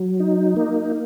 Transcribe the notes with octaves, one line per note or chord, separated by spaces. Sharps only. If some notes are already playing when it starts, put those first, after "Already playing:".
Already playing: F#3
D#4
A#3